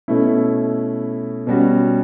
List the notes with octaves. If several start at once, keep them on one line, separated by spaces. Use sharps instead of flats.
B2 A3 C#4 E4
B2 G3 C#4 F#4